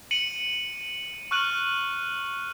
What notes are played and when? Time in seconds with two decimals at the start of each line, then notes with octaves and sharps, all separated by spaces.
0.11 C#7 D#7 F#7
1.31 C#6 F6 F#6 D#7 F#7